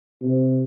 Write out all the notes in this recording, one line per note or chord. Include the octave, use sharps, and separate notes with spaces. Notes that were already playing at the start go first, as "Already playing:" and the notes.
C3